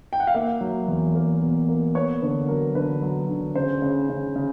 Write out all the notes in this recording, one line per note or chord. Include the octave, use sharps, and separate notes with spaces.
G5
F#5
F5
A#3 E5
F#3
E2
A#3
B2
A#3
B3 C#5
D3 B4
F#3 A#4
D3 B4
F#3
D3
C#3 C5
C#3
C#3
C#3